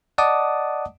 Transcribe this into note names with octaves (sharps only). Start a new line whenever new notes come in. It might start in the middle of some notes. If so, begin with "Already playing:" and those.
D5 D#5 F#5 A5 D6 D#6